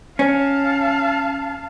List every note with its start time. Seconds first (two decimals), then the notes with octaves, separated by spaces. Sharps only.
0.19 C#4 F5 A5